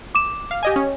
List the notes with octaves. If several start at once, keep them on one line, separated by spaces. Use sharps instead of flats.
D6 E7
F5
G4 D#5 G#5
C#4